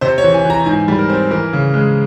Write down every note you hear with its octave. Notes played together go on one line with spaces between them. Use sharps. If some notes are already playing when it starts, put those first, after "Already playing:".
C3 C5
C#5
E3
G#5
E3
A#5
G#2 G#5
G3
A#4
C4
E3 A#4
C#3
G#3